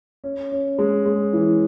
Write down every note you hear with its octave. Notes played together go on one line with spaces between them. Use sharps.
C#4
C#4
G#3
G#3
E3